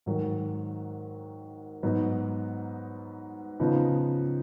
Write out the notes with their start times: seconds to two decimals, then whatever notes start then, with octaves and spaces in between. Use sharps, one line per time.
0.06 G#2 D#3 F#3
1.83 G#2 F#3 B3 D#4
3.60 C#3 F3 B3 D#4